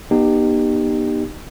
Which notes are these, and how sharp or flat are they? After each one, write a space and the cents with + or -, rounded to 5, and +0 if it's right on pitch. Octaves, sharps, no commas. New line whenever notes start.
B3 -35 D#4 -30 G4 +0